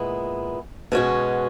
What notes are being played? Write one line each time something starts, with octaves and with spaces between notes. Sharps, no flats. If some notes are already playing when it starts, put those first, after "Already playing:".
Already playing: A#2 G#3 B3 E4
B2 G#3 C#4 F#4